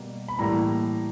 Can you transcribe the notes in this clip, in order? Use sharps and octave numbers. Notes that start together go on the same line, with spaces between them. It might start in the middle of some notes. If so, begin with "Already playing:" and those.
Already playing: B2 G3 A#3
B5
A2 E3 G3 A#3 A#5